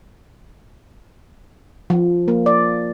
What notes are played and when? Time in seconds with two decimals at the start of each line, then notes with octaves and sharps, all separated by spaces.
1.90 F3
2.28 A#3
2.46 D5